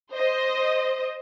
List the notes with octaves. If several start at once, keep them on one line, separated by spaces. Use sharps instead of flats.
C5 D#5